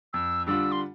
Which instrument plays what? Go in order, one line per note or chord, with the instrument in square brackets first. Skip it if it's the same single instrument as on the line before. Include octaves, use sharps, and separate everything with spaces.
[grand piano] F2 [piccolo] E6
[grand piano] D3 G3 D4 F4 [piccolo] E6
[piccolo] C6